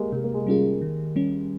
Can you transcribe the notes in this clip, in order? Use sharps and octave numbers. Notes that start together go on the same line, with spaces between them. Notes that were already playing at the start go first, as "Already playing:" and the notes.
Already playing: G3 G#3 A#3
C3 G#3
A#3
G#3
G3 C#4 F4 G#4
D#3
G3 C#4